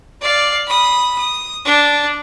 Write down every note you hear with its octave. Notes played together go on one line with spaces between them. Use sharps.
D5 F5
B5 D#6
D#6
D4